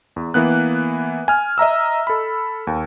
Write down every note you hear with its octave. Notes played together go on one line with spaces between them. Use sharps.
E2
E3 A#3 B3 F#6
G#5 F6
D#5 E5 A#5 E6
A4 B5
D#2